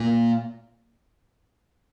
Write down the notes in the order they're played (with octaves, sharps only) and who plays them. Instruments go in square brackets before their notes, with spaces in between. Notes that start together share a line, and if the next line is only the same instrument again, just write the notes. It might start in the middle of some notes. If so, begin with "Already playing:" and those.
Already playing: [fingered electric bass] A#2